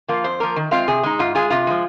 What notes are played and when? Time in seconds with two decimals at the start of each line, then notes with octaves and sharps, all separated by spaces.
0.08 F3 A#3 F4
0.24 F2 C5
0.40 F3 A#3 A#4
0.56 D#3
0.71 G#3 C4 F4 F5
0.88 C3 G#4
1.03 G#3 D#4
1.19 G#2 F4
1.35 G#3 F4 G#4
1.50 C3 F4
1.67 F3 G#3